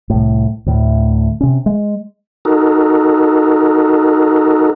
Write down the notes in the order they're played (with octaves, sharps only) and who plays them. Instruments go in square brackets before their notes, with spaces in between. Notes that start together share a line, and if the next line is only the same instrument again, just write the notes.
[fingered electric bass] C2 A2
D2 A2
C3 C#4
G#3
[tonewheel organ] D#4 F#4 A4 A#4